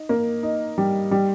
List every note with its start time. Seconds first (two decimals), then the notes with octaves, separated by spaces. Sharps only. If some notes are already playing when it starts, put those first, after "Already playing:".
Already playing: D#4
0.09 A#3
0.43 D#4
0.78 G3
1.11 G3